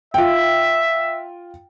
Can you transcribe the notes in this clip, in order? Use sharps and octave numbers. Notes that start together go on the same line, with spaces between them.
F4 E5 G5